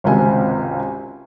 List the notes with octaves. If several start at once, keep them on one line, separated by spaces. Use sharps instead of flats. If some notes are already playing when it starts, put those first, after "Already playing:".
G#1 C#2 C3 G#5